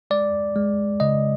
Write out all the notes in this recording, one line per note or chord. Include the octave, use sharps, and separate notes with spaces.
G#3 D5
G#3
C#3 D#5